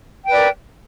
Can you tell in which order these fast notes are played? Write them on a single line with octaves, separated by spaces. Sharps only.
G5 B4 D5 A#4